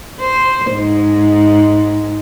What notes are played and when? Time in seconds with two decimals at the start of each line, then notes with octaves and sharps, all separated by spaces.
0.20 C5
0.72 G#2